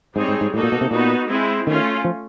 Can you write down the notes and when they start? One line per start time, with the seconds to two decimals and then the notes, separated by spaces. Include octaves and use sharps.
0.16 G#2 G3 C4 D#4 G#4 C#5
0.28 G#2
0.41 G#2
0.53 A2 A#3 D#4 F#4 A4
0.63 A#2
0.72 B2
0.81 C3
0.91 A#2 B3 D#4 F#4
1.28 G#3 C4 E4
1.66 D#3 A3 C#4 F4
2.05 F3